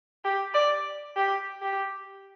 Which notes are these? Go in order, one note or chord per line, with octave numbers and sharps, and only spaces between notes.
G4
D5
G4
G4